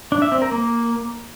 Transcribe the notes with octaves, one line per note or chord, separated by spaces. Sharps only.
D4
E5
C4
A#4
A#3